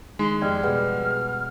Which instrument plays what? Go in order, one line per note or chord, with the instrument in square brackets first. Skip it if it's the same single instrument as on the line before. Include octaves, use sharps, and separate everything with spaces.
[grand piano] D#3 [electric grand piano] G#3 [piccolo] C6
[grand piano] F2 G4 D#5 [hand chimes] D5 G5 G#6 [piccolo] F6
[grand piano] B2 G3 [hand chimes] G#4 B4 F#5